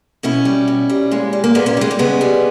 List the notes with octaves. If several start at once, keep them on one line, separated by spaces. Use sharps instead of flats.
B2 C#4 E4
G3
B2
G3
A#2 G#3
G3
A#3
A#2 G#3 B3
A#3 C#4
G3 G#3
A#3
C#3 G#3 B3
G3